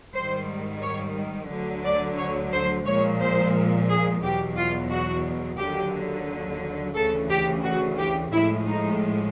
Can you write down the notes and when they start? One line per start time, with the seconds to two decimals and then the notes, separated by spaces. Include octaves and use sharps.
0.13 G#2 D#3 G3 C5
0.81 C#5
1.49 D2 D3 F#3
1.84 D5
2.18 C#5
2.52 C5
2.86 A#2 F3 G#3 C#5
3.21 C5
3.88 G#4
4.23 E2 B2 F#3 G4
4.56 F4
4.91 F#4
5.58 D#2 D3 F#3 G4
6.95 D2 C#3 E3 A4
7.30 G4
7.63 F#4
7.98 G4
8.31 A2 F3 G#3 E4
8.66 D#4